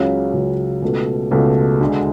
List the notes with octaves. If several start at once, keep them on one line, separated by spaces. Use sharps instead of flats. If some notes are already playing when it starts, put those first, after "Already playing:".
Already playing: C#2 C#3 F#3
C#2 C#3 F#3
C#2 B2 A3
C#2 B2 A3
D2 D3 G#3